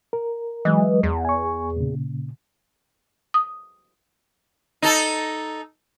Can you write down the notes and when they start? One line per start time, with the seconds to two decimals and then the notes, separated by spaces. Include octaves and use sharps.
0.13 A#4
0.65 E3 F#3 G#3 D#5
1.03 E2
1.25 G#5 C#6
1.76 A#2 C#3
3.34 D#6
4.82 D#4 A4